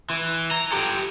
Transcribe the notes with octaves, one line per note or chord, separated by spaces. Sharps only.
E3
A#5
G4 A4